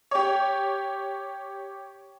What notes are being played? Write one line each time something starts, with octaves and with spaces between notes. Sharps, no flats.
G4 C#5